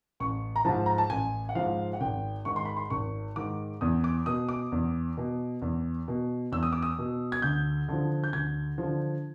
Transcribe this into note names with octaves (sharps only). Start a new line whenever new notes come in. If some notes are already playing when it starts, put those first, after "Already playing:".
A1 C#6
A#5
G#2 F3 A5
A#5
A5
A1 G#5
F#5
G#2 F3 F5
F#5
G#1 G5
G#2 D#3 C#6
C6
B5
C6
G#1 C#6
G#2 D#3 D6
E2 D#6
D6
B2 D#6
D6
E2
B2
E2
B2
E2 E6
D#6
D6
D#6
B2
G#6
D2 G6
D3 F3
G6
D2 G#6
D3 F3